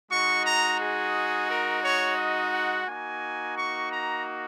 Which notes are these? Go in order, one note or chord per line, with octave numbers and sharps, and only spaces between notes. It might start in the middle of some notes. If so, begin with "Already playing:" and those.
G#3 D#4 F#4 C#6
A#5
G#4
A#4
C#5
D#5
F#5
A#3 D#4 F#4 G#5
C#6
A#5